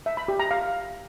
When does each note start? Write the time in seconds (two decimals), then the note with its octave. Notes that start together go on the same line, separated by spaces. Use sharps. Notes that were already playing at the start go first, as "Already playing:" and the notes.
0.06 E5
0.17 B5
0.28 G4
0.40 A#5
0.51 F5